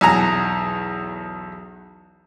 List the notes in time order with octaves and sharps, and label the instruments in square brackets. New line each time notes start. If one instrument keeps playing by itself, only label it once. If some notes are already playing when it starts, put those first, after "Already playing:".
[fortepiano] B1 E2 G#5 A#5